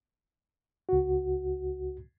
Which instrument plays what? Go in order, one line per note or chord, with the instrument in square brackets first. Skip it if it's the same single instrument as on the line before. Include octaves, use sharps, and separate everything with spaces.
[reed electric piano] C#2 F#4